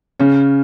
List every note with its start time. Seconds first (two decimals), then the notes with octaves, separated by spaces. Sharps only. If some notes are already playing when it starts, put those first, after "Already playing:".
0.19 C#3 C#4